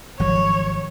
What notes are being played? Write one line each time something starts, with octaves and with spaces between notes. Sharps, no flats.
G#1 F3 F#3 C#5